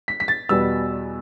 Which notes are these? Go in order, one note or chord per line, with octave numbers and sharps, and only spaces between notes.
B6
B6
A6
E2 B2 G3 B3 E6